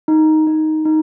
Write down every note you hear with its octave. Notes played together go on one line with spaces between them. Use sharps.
D#4
D#4
D#4